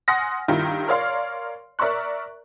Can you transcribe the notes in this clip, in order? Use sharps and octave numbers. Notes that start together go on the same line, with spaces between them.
F#5 G#5 C6 D#6 F6 A#6
G2 D#3 G3 E4 F4 G4
A#4 C#5 D5 F5 C6
A#4 D5 E5 A#5 C#6 F#6